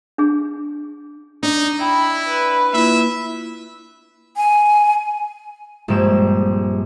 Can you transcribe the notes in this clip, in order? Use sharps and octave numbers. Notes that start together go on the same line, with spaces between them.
D4 G#4
D4 D#4
E4 G5 B5
B4
A#3 E4 F4 E5
G#5
A#1 G2 G#3 C4 G5 E7